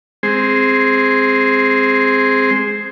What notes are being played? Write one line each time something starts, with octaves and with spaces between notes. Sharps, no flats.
G#3 C4 G#4 C5